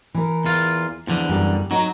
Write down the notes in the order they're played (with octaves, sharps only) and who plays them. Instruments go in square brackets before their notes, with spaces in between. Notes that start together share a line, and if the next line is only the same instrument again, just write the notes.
[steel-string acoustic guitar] E3 A#4
[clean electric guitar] E2 F4
[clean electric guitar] E2 D3 [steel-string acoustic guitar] F3
[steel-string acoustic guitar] F#2 G3
[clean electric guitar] F#3 [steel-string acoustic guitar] D#4 F#5 A#5